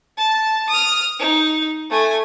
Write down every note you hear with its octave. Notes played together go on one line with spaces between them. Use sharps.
A5
D#6 F6
D#4
A3 G#5